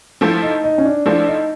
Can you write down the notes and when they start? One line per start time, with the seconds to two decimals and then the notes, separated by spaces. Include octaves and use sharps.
0.21 F3 A3 C4 E4
0.42 D#4
0.64 D#4
0.78 C#4
0.85 D4
1.06 F3 A3 C4 D4 E4
1.28 D#4